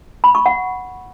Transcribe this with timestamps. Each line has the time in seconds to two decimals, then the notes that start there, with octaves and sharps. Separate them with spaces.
0.24 B5
0.35 C#6
0.46 F#5